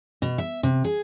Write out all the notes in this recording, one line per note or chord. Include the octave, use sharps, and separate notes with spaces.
B2
E5
C3
G#4